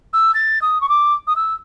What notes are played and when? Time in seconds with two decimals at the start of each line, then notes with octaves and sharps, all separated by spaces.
0.13 E6
0.34 A6
0.62 D#6
0.81 C#6
0.89 D6
1.27 D#6
1.36 E6